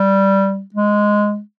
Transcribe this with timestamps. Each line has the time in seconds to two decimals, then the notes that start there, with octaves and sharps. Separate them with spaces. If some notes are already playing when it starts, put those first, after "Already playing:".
Already playing: G3
0.74 G#3